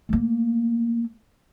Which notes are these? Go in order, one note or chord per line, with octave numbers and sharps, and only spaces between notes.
A3 A#3